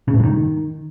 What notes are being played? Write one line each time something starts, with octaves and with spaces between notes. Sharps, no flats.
C#3
A2
G2
D#3